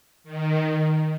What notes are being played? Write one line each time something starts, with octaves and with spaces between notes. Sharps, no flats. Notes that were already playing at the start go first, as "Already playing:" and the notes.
D#3